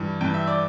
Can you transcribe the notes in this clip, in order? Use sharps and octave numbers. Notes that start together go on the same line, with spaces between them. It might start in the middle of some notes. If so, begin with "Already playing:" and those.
Already playing: G2 E3
G2 E3 G5
E5
D5